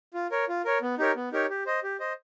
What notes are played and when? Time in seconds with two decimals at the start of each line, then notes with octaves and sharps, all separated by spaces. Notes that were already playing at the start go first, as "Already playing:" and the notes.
0.14 F4
0.31 A#4 C#5
0.49 F4
0.65 A#4 C#5
0.82 B3
0.98 D#4 G4 A#4 C#5
1.16 B3
1.32 D#4 G4 A#4 C#5
1.50 G4
1.66 C5 D#5
1.83 G4
2.00 C5 D#5